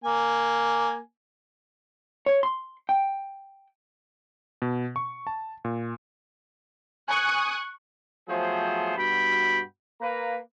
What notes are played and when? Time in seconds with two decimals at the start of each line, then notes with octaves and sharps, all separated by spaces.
0.04 A#3 G#5
2.26 C#5
2.43 C6
2.89 G5
4.62 B2
4.96 C#6
5.27 A5
5.65 A#2
7.08 G#5 C#6 D#6 F#6 D#7
8.28 F3 F#3 A3 B3 G#4 C5
8.97 G2 B2 F#4 G5 B5
10.01 A#3 B4 A#5